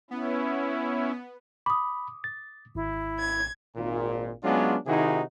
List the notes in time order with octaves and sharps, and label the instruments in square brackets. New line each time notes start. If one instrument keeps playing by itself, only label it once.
[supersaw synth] B3 [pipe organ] C#4 E4
[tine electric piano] B5 [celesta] D6 D#6
[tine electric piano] A6
[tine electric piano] G#1 [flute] E4
[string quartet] G#6
[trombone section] G#1 A#2
F#3 G#3 B3 C#4 D4 F4
C3 D#3 D#4 E4 F#4 G#4